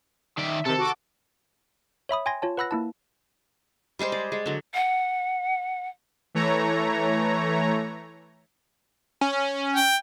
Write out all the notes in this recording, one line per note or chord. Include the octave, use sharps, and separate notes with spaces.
D#3 D5 E5
C3 D#3 A4
F#4 D6
C#5 E5 B5 D#6
G5 G#5 C6 G#6 A#6
F4 C#5 A5
B4 F#5 B5 E6 F#6 A#6
A#3 E4 A5
G3 G#3 G#4 C5
D5
G#3
D3 F#3
F#5
E3 A3 C#5 A#5
C#4
G5